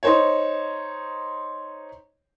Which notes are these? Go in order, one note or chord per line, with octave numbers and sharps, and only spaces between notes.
D#4 C5 C#5